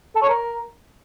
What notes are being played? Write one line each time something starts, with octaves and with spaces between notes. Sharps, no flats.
A4
C#5
A#4